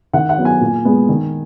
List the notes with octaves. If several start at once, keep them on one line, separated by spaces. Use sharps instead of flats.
D#3 F#5
F#5
F#3 B3
G#5
A#2
G#3 B3
D#3